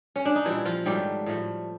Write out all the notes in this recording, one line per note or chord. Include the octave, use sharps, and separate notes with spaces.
C#4
D4
D#4
A#2 E3 G3 E4
F3 F4
G#2 D#3 F#3 G3 A3 G4
A2 F3 A3